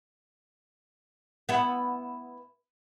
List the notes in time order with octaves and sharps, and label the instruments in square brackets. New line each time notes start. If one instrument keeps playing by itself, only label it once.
[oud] B3 E4